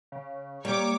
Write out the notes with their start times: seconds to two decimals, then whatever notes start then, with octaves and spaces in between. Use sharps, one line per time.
0.12 C#3
0.65 G3 A#3 C#5 D6